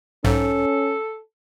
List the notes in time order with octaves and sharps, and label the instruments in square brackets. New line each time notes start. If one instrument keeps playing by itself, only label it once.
[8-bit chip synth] B1 G#2 [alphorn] C#4 [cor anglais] A4